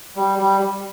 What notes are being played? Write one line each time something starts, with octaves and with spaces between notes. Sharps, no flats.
G3
G3
G3